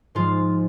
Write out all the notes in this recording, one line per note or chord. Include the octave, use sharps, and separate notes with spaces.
G#2 F3 G#3 F4